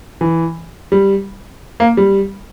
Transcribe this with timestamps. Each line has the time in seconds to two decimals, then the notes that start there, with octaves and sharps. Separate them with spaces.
0.21 E3
0.92 G3
1.80 A#3
1.97 G3